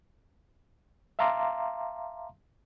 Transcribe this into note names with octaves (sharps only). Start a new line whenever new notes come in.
E5 F5 A5 A#5 C6 D6